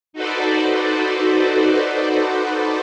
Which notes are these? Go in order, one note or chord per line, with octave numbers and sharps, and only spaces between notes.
D#4 F#4 A4 B4 C5 D5